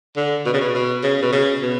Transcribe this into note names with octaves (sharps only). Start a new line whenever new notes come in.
D3
B2
C#3
B2
B2
C#3
B2
C#3
B2